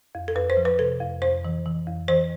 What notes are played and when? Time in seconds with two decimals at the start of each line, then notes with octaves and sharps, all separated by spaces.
0.15 F2
0.28 A4
0.35 F2 B4
0.50 C5
0.57 F3
0.65 B4
0.79 C3 A4
1.01 F2
1.22 F2 C5
1.45 E3
1.66 E3
1.87 F2
2.08 E3 C5